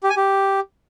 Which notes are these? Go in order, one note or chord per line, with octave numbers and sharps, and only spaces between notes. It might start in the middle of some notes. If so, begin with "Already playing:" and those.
G4
G#5
G4